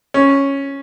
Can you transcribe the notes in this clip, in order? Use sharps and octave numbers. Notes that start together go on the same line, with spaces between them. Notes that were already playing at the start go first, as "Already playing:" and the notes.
C#4